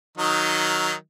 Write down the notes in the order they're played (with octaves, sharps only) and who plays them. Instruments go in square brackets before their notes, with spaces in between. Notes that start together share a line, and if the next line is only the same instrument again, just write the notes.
[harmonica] D#3 F#3 D#4